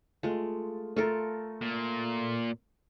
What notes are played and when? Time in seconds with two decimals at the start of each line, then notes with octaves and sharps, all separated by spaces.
0.23 G#3 A3 F4
0.96 A3 F4 A4 A#4
1.61 A#2